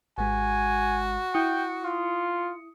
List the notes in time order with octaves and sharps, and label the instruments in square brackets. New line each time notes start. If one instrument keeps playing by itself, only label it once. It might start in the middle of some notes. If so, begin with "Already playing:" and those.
[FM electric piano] G#1 G#3 [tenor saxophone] F#4 [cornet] G#5
[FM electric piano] E4 D#6 C#7 [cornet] G5
[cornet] F4